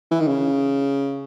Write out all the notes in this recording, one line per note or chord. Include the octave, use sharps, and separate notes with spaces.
E3
D#3
C#3